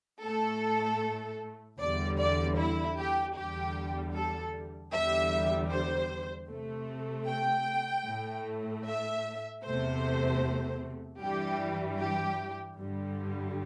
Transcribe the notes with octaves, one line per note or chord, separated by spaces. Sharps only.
A2 A3 A4
E2 D3 G3 D5
D5
E4
G4
E2 D3 G3 G4
A4
E2 D3 G3 E5
C5
C3 A3
G5
A2 A3
E5
E2 C3 A3 C5
G2 E3 G3 G4
G4
G2 D3 G3